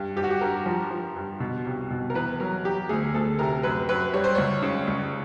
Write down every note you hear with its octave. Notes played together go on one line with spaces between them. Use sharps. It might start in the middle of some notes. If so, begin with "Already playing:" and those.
Already playing: G2
G2 G4
F#4
G4
G2 A#4
F3
F3
G2
B2
C2
B2
A#4
E2 B4
F#3 A#4
F#3 G4
D2 G#4
D2 A4
C3 A#4
F#2 B4
F#2 B4
G3 C#5
C5
C#2 C#5
C#3
C#2